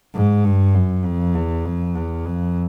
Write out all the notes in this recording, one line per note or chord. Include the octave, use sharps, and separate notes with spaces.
G#2
G2
F#2
F2
E2
F2
E2
F2